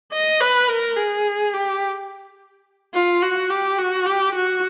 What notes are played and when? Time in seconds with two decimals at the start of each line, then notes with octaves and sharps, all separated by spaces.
0.13 D#5
0.41 B4
0.69 A#4
0.96 G#4
1.54 G4
2.94 F4
3.22 F#4
3.50 G4
3.78 F#4
4.06 G4
4.35 F#4